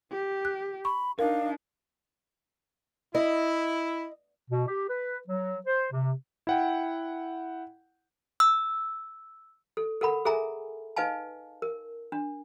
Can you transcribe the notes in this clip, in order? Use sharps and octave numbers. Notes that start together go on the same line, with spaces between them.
G4
F#6
B5 C#6
D4 D#4 A#4 F5
E4 D#5
B2
G4
B4
F#3
C5
C3
E4 F#5 G5
E6
A4
A4 A#4 F#5 B5
G#4 A4 E5 G#5 A#5
D#4 B4 D#5 F5 G#5 A5
A#4
D4